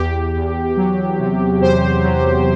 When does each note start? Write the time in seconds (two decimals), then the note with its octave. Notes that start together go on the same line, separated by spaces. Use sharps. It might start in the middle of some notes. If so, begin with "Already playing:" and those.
Already playing: E2 G4
0.35 E2
0.77 F#3
1.19 C3
1.61 E2 C5
2.03 F#3